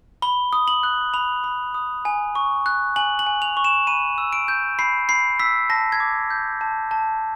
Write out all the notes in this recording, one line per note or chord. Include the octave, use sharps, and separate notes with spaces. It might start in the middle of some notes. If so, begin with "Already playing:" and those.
B5 G7
D#6
F#7
F#6
B5 F7
B5
D#6
G#5
C#6
F#6
G#5 F#7
F#7
G#5
F7
C#6
E7
B5 D#7
E6
D7
G6
B5 C7
B5 C7
E6 B6
A5 A#6
G#6
D6
G6
A5
A5